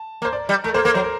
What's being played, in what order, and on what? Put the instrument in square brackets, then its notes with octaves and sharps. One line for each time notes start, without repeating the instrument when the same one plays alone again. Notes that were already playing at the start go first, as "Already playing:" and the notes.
Already playing: [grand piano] A5
[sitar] A#3
[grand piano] C5
D5
[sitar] G3
[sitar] A3 [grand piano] A#4
[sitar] A#3 [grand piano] C5
[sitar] A#3 [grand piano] A#4
[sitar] F#3 [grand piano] C5
[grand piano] A#4